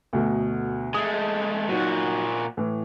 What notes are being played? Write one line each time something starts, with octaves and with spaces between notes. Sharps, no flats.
D2 B2 A3
G#3 A3 D#6
A#2 F#3 D#4 F#4
A2 E3